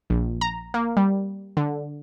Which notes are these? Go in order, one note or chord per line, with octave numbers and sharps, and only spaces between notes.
A#1
A#5
A#3
G3
D3